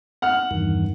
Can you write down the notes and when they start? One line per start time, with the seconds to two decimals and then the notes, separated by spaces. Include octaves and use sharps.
0.22 F#5 F6
0.51 E2 G2 D#3